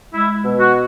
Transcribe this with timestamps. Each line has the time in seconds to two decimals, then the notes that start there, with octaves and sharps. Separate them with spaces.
0.14 G#3 E4
0.45 B2
0.60 F#4